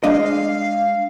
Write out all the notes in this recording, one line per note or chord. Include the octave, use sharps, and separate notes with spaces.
G#3 D4 D#5 F5